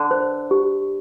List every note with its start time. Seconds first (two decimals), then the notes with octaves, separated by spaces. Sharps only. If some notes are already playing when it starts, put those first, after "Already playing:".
Already playing: D3
0.11 C5
0.51 G4